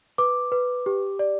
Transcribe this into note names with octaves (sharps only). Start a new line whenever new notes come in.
B4 D6
B4
G4
D5